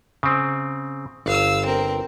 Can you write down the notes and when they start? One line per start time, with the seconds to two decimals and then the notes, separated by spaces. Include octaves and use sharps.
0.23 C#3 C4
1.26 G1 F5 E6
1.65 C4 A#4